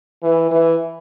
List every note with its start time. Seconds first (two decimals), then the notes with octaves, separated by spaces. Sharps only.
0.23 E3
0.51 E3